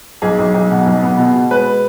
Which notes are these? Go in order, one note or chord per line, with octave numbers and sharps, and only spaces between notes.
B1 G#4
B1
B1
B2
B1
B3
B2
B2
G#3 B4